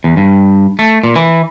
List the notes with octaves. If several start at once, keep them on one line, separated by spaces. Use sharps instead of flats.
E2
G2
A3
A#2
E3